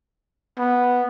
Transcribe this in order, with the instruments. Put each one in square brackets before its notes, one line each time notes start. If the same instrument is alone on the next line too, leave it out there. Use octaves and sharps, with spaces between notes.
[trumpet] B3